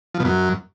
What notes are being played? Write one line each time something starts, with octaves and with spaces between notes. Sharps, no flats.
F3
B2
F#2